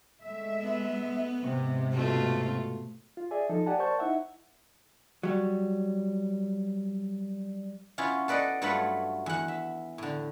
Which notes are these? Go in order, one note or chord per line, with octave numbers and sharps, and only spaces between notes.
G#3 A3 E5
B3
G#2 C3
B2 A3 F4
F4
G#4 D5 E5 G#5
F3 D#4 A4
G4 D5 F#5 G#5 A5
A#4 C5 D5 A5 C#6 G6
D#4 E4 E5 F#5
F#3 G3
B3 C#4 E4 F4
A4 B4 D5 D#5 F#5
G2 F#3 A3 F4 B4 B5
E2 F#5
E5
A2 D3